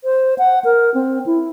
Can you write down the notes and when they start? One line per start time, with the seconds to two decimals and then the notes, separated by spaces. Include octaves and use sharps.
0.04 C5
0.38 F#5
0.65 A#4
0.94 C4
1.26 E4